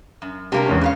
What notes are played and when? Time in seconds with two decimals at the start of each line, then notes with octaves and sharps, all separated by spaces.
0.22 F#2
0.52 C3 G3 A#3 D4 A#4
0.66 E2 G#2 C#4
0.81 F2 C#3 C#5 F5